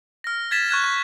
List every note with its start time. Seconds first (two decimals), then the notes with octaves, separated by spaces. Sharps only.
0.24 F6 A#6
0.51 G#6 A6 B6 E7
0.69 C#6 F#6 G#6 E7
0.84 C#6